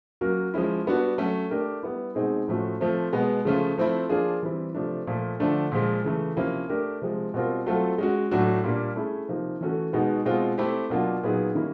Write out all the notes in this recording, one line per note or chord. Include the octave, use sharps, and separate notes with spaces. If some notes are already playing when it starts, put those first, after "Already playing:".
F#3 A#3 C#4 F#4 A#4
F3 G#3 C#4 E4
G3 B3 D4 F#4
F#3 A3 C#4
A3 D4 G4 A#4
G3 B3 E4
B2 G#3 C4 D#4 G#4
A2 F3 A3 C#4 F#4
F3 A3 C4
B2 G#3 B3
C#3 F3 A3 C#4 F4
F3 A3 C4 E4
F3 A#3 D4 F4 G#4
E3 G3 C4 E4
C3 F3 A3 D4
A#2 F3 A3
D3 F3 A3 D4
A#2 F3 G#3
C#3 E3 A3
C3 F3 A#3 C#4 E4
A3 D4 G4 A#4
C3 F3 G#3
B2 G3 C4 F4 A#4
F#3 A3 C4 F4 A4
G#3 C#4 F#4
A2 F#3 A3 D4 F#4
A#2 G3 A#3 D4
A3 C#4 E4 G#4
C3 F3 A#3 D#4
E3 A3 C#4 F#4 A4
B2 G#3 B3 D#4 F#4
B2 G#3 C4 F4
A3 C4 E4 G4
B2 F#3 A#3 D4 F4
A#2 F#3 B3 D#4 G#4
D#3 G3 A#3 C#4 E4